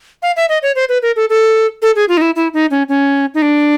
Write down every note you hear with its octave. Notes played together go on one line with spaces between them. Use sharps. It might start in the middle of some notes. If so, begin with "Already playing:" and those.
F5
E5
D#5
C#5
C5
B4
A#4
A4
A4
A4
G#4
F4
D#4
E4
E4
D#4
C#4
C#4
D#4
D4